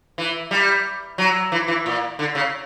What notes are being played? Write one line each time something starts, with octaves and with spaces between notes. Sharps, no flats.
E3
G3
F#3
E3
E3
A#2
D3
C#3